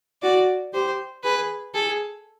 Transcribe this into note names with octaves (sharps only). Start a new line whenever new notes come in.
F#4 D5
G4 C5
G#4 B4
G#4 A4